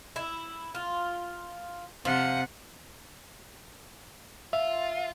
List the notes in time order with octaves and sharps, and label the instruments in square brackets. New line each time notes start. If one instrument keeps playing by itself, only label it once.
[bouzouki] E4
F4
[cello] C3 F#5 [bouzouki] F3
[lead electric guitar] F4 [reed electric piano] E5